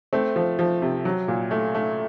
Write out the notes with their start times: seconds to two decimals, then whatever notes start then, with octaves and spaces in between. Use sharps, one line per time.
0.13 A3 C4
0.36 F3
0.59 F3
0.82 C3
1.05 F#3
1.28 A#2
1.51 A3
1.75 A3